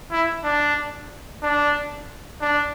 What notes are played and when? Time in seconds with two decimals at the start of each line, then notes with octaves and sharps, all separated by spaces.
0.12 E4
0.44 D4
1.43 D4
2.41 D4